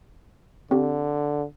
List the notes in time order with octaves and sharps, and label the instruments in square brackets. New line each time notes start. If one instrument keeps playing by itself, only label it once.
[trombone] D3 [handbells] C4 G4